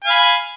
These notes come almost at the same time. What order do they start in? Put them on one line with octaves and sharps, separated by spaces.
G#5 F5 B5